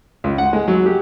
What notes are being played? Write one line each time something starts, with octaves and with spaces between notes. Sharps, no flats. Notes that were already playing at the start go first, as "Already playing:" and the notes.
C#2
F#5
G#3
F#3
G4